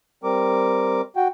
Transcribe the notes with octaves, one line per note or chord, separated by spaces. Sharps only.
G3 C4 A#4 D6
F#4 G5